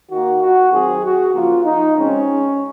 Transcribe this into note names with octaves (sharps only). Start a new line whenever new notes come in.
D#3 A#3 F#4
F#4
D#3 F#3 C4 G#4
F#4
C#3 F3 A#3 F4
D#4
C#3 G#3 C4 C#4